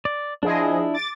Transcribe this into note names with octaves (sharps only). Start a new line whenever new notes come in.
D5
F3 D4 E4 G#4 D#5
D6 A6